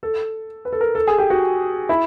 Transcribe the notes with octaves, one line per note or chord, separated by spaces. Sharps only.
A4
B4
A4
A#4
A4
G#4
G4
F#4
E4